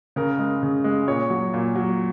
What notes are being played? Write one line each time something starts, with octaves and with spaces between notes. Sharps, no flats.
C#3 A#4
G#3
C#3
G#3
A#2 C#5
F#3
A#2
F#3